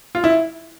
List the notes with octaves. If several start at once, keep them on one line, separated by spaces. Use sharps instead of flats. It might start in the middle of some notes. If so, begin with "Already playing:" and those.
F4
E4